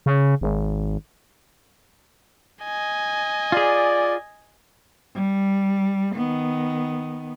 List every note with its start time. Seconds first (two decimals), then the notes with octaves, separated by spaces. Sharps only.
0.06 C#3
0.41 G#1
2.64 D#5 G#5
3.52 F4 G#4 D5
5.14 G3
6.15 D#3 B3